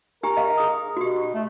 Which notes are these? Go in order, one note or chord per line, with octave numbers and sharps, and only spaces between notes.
G4 A#4 G#5
D#5 F5
G#4 D#6
B2 F#4 G4
A3